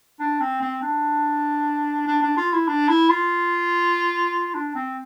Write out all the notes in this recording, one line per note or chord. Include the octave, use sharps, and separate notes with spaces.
D4
C4
C4
D4
D4
D4
F4
E4
D4
E4
F4
D4
C4